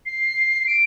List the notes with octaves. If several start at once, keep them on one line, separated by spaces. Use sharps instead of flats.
C7
D7